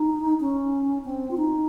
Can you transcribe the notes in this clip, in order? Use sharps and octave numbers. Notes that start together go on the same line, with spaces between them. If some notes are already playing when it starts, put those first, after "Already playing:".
Already playing: D#4
C#4
C4
F4
D#4